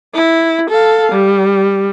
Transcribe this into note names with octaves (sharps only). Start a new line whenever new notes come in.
E4
A4 F5
G3